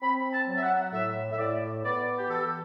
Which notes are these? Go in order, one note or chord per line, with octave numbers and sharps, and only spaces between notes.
C4 B5
A5
F#3
E5
F#5
A2 E5
E5
A2 D5
B3 D5
G4
E3 A4